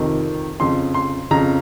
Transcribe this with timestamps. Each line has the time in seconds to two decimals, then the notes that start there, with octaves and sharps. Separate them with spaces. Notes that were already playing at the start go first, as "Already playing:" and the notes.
Already playing: F2 C3 D#3
0.60 F2 C#3 C6
0.94 C6
1.31 F2 C#3 A#5